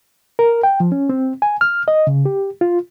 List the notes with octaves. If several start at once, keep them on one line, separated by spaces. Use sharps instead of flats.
A#4
G5
F3
C#4
C4
G#5
F6
D#5
C#3
G4
F4